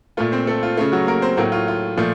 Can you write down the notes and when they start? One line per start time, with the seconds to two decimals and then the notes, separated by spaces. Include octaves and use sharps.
0.17 A#2 A3 F4
0.32 C4 C5
0.47 A3 A4
0.63 F4
0.77 A3 F4
0.81 C#3
0.92 F#3 F#4
1.07 A#3 A#4
1.22 C4 C5
1.37 A2 F#3 A3 A#3 A#4
1.52 F4
1.68 F4
1.97 A#2 F3 A3